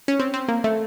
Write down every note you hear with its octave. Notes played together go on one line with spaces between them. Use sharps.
C#4
C4
C4
A#3
A3